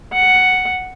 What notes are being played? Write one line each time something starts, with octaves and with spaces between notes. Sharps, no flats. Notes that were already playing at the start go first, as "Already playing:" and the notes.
F#5